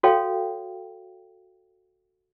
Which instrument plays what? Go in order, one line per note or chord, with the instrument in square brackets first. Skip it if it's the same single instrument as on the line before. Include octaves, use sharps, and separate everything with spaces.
[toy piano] F#4 A4 C#5 F5 G5